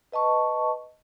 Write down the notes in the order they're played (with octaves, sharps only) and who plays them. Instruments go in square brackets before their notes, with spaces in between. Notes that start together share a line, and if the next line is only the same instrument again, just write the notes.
[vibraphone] B4 D#5 A5 C#6